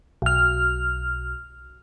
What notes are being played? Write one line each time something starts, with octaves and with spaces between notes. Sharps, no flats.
B1 F6